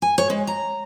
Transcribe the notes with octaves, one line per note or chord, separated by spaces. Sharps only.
G#5
C#5
G#3
A#5